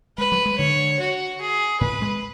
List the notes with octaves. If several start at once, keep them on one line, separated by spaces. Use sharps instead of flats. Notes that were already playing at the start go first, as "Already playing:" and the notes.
G#3 B4
F#3
G#3
D3 C#5
F#4
G#4
A2 B4
G#3